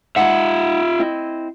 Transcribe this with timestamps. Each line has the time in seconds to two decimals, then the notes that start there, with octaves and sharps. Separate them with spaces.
0.16 G#3 D#4 F4 E5 F#5
0.99 C4 E4 D#5